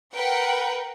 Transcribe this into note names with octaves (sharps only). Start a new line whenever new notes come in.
A#4 B4 F#5 G5